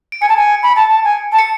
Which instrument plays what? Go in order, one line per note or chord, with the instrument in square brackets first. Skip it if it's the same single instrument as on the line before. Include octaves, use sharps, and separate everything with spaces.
[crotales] D7
[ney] G#5 [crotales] C#7
[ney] A5
G#5
B5
A5
A5
G#5
A5
[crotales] C#7